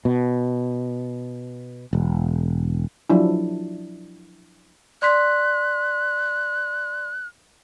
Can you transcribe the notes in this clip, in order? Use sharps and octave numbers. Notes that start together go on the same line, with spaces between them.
B2
E1
F3 F#3 D4 E4
D5 C6 F#6 B6